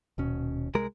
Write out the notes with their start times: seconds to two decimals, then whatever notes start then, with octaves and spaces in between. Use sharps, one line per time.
0.18 D#1 B2 C#4
0.75 C2 G#3 A#4